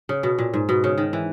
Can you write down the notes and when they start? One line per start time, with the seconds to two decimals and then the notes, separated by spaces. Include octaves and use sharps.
0.09 C#3
0.23 B2
0.39 A#2
0.54 G#2
0.69 B2
0.84 C#3
0.98 D#3
1.13 E3